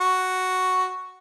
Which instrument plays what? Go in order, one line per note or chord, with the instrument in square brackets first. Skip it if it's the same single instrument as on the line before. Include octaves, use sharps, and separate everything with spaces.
[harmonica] F#4